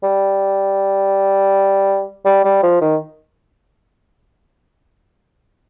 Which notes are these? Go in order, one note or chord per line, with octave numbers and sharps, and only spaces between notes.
G3
G3
G3
F3
D#3